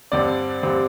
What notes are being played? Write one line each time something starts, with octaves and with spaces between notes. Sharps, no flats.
G2 D3 G3 C4 D5
G2 D3 G3 C4